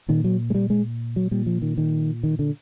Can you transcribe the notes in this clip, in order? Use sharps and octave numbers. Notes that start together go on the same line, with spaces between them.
A#2 D#3
F#3
G#3
G3
G#3
F#3
A#2 G3
F3
D#3
D#3
D#3
D3